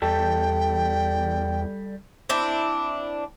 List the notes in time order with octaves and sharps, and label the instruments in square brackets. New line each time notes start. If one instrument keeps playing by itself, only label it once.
[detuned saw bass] E2 [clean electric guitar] G3 A4 [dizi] G5
[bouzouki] C4 D4 E4